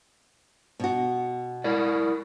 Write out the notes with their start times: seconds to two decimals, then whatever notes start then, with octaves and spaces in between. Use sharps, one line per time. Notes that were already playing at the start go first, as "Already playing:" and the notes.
0.80 B2 F#4
1.64 E4 A#4 D5